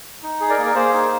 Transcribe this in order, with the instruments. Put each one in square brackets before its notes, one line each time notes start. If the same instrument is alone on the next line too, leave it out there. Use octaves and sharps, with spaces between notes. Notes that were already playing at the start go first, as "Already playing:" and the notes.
[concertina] D#4
G#4
A#4 D5
A#3
A#4
A#3 G#4 C5
D#4